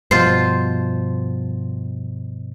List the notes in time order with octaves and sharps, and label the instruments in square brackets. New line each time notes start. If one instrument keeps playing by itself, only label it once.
[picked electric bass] G2 B2 F3 [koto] F4 C5